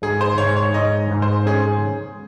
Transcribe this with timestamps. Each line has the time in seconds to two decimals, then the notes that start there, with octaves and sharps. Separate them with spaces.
0.02 G#2 G#4
0.21 C5
0.38 G#2 C#5
0.57 C#5
0.74 G#2 D#5
1.11 G#2
1.22 C5
1.46 C#4 G#4